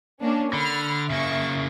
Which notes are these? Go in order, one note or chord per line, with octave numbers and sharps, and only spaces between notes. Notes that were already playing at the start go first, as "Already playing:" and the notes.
A#3 C#4 D4
D3 B5 F6
C#3 A#3 E5 C#6